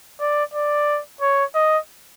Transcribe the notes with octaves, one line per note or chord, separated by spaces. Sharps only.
D5
D5
C#5
D#5